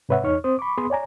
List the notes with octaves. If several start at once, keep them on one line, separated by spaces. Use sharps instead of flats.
G#2 C3 B4 C#5 E5 F#5
E2 D#4 C#5 C#6 F6
C4 C5 D#6
B5 C#6 D6
B3 G#4 B5 C6 D#6
C#5 D5 G#5 A#5